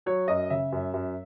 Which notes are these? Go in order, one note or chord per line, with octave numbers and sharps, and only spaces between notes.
F#3 C#5
F#2 D#5
C#3 E5
F#2
F#2